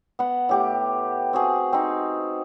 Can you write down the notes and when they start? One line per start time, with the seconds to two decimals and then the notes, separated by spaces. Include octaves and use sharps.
0.19 B3 F#5
0.49 A2 G4 D6
1.33 C4 F#4 G#4
1.73 C4 D#4